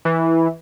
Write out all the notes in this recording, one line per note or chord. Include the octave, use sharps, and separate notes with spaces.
E3